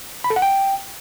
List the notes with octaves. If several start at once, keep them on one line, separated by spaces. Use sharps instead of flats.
B5
A4
F#5
G5